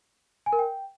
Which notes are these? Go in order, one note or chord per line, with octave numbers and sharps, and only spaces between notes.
G#5
A#4
G5